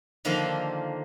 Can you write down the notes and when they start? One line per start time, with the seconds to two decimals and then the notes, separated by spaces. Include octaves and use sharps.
0.25 D3 D#3 F3 A#3 D4 F4